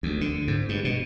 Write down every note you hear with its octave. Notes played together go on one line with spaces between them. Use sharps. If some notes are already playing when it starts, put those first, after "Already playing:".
D2
D3
G#2
G2
B2